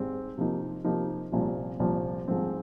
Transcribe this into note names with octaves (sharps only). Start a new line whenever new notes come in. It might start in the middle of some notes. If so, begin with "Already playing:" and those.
Already playing: G#2 G3 C4
C3 F3 A#3 D#4
C3 F3 A#3 D#4
C2 A#2 F3
C2 A#2 F3
G#2 F3 C4